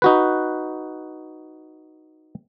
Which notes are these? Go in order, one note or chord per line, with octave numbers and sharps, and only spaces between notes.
D#4 F#4 B4